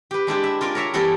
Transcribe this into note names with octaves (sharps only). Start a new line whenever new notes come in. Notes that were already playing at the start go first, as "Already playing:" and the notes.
G4 B4
G#3 D4 E4 G4
E5
F4 A#4 D5 G#5
A#4 C#5 E5 A#5
E3 G3 B3 E4 A4 A#4